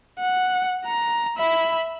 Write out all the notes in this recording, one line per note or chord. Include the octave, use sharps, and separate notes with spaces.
F#5
A#5
E5 B5